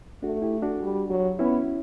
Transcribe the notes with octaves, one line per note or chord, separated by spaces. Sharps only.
A3 D4 F#4
E4 G4
D4 F#4
G3
F#3
B3 C#4 E4